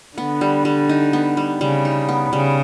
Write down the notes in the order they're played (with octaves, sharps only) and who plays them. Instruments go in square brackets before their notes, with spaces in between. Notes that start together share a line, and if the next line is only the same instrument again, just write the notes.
[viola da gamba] D3 [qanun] B3
[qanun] G3
G3
D#4
B3
G3
[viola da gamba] C#3 [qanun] G3
[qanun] D#4
B3
[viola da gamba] C#3 [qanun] G3